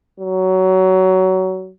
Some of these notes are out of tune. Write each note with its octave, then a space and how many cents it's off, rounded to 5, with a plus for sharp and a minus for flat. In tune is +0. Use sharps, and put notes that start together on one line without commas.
F#3 +20